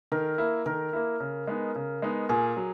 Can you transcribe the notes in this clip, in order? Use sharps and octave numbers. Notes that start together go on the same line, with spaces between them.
D#3 A#4
A#3 E4
D#3 A#4
A#3 E4
C#3
G#3 B3 D#4
C#3
G#3 B3 D#4
A#2 G#4
F#3